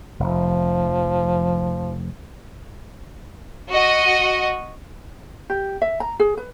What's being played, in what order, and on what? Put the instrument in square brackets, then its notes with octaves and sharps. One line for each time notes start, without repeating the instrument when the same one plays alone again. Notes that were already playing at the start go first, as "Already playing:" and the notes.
[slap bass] F1 [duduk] F3
[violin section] F#4 D#5
[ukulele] G4
E5
A#5
G#4
B4